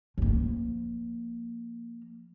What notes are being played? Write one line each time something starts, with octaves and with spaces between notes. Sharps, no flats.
F3 A#3